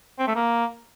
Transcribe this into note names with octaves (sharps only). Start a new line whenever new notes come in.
C4
A3
A#3